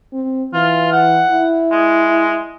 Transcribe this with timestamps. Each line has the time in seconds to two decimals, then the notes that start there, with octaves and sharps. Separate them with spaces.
0.13 C4
0.54 E3 F4
0.93 F#5
1.30 E4
1.72 G#3